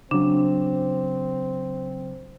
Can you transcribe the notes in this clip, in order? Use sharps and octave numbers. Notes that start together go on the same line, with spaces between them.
C#3 F#3 C4 D4